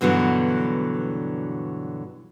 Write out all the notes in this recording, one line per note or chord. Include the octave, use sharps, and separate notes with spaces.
G2 B2 D3 E3 F#3